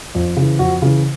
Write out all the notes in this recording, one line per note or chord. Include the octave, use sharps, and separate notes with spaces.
F2
C#3 E3
F2 F#4
C#3 E3